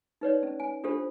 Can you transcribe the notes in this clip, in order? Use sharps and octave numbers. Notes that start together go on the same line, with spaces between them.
D#4 B4 C#5 D5
C#4
G#5
D4 F4 G4 A4 C5